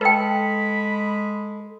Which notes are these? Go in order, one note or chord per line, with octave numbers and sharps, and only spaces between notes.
G#3 A4 B4 G5 B5